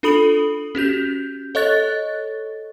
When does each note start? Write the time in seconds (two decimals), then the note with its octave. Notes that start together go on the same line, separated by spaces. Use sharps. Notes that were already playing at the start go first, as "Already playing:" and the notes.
0.03 D4 F4 A4 B5 D#6 F#7
0.75 C#4 F#4 G4 G6
1.55 A4 C#5 D#5 C#6 F#6 A6